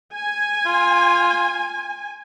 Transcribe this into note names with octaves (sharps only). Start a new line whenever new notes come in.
G#5
F4